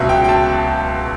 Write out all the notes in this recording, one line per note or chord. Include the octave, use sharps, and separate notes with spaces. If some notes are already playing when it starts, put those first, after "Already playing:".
Already playing: C#2 B2 F#3 E5
G5
G5
A5